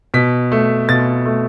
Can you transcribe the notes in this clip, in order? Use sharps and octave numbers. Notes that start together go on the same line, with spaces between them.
B2 B6
A3
B2 A6
A3